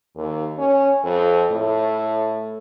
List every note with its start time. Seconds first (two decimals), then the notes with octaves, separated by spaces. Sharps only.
0.16 D#2
0.58 C#4
1.04 F2
1.51 A2